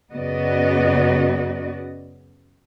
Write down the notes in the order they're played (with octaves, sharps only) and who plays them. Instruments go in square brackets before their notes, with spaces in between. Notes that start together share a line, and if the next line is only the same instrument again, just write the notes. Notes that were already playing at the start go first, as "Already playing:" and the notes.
[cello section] F#2 C#3 B3 F#4 D5 D#5